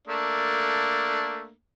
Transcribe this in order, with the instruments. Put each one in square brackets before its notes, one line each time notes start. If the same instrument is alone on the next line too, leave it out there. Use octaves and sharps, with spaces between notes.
[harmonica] A3 A#3 D4